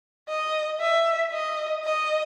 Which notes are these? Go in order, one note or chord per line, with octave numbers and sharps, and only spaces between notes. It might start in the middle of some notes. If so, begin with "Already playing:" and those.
D#5
E5
D#5
D#5